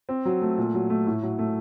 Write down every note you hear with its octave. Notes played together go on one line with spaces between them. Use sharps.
C4
F#3
A3
A#2
F#3
A3
A2
F#3
A3